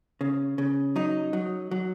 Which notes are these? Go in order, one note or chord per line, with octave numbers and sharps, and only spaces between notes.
C#3
C#3
F#3 D#4
F#3
F#3